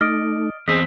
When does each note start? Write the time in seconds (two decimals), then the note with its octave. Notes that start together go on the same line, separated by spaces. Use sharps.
0.01 A3 D#4 D5 D#5 F6 D7
0.68 E2 C4 G#4 D#5 B6